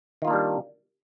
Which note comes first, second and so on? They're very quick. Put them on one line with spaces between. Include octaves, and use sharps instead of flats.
D#3 F4 A#3 D4 G3